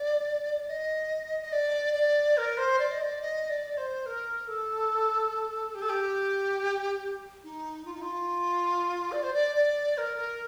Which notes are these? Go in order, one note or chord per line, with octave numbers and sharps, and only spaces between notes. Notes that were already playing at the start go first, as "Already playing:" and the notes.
Already playing: D5
D#5
D#5
D5
D5
A#4
C5
D5
D#5
D5
D#5
D5
C5
A#4
A4
G4
A4
G4
D#4
F4
D#4
F4
D5
C5
D5
D5
A#4
A#4